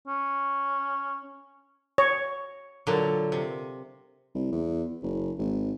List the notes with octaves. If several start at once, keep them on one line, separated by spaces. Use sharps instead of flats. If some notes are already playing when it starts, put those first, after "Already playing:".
C#4
C#5
A#2 D3 F#3
C3
C2
E2
F#1
G#1